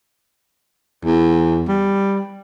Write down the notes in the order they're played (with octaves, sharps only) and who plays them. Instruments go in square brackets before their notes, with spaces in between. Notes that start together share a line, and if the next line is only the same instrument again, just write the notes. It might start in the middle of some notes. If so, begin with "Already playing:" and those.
[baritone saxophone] E2
G3